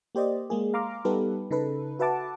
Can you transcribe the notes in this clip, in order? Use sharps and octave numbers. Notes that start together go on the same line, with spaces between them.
A#3 G4 C5 D5 D#5
G#3 A#3 G#4
F5 A#5 C6 D6 F6
G3 B3 D#4 G4 A4 B4
C#3 D#4 A4 B4
F#4 B4 E5 F#5 A5 D6